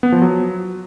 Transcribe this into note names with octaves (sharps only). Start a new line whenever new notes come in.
B3
F3
F#3